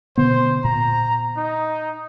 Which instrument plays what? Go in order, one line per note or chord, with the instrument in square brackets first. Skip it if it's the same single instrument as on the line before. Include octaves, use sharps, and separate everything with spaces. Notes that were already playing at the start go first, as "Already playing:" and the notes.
[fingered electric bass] B2 D3 B3 [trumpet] C5
[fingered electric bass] A#2 [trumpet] A#5
[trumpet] D#4